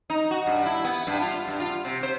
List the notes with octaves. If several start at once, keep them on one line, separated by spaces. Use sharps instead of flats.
D#4
F#4
G2
E4
B3
G2
F4
G2
F4
C3
C5